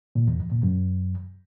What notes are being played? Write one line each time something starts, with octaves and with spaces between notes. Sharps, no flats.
A#2
E2
F2
A#2
F#2